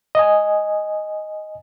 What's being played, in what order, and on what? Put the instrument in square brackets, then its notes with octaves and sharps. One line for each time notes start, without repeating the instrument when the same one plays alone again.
[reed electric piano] D#5 G#5